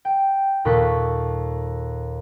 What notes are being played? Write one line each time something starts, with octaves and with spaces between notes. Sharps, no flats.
G5
D#2 A#2 A4 C#6 F#6 B6